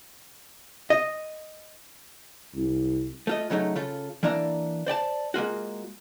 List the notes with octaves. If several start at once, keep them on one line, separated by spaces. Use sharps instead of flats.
D#5
C2
A3 F4 D#5
C#3 F#3 A3 D4 D#4
C#3 F4 A4
E3 A#3 D4 D5 A#5
C5 D5 G5 A5
G#3 A#3 F4 F#4